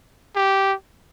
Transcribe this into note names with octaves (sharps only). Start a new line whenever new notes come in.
G4